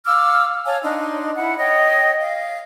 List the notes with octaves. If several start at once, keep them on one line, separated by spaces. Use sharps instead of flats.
F5 D6 E6 F6
C#5 F5 G#5 A5
D4 D#4 C6
E4 F#5 B5
C#5 D#5 G5
F5